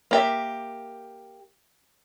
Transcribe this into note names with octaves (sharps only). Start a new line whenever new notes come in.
A#3 G4 E5